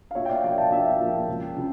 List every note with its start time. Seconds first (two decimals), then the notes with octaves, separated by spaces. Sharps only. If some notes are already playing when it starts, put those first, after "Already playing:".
0.11 F5
0.15 A#2 C#5 E5
0.25 G5
0.29 D5 F5
0.44 F3 A#3 E5 G5
0.58 F5 A5
0.72 A#2 E5 G5
1.00 F3 A#3
1.28 C#2
1.56 C#3 F3